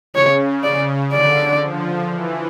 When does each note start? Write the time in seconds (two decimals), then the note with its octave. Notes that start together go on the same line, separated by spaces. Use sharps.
0.15 C#3 C#5
0.64 D5
1.12 D3 D5
1.61 F3
2.10 E3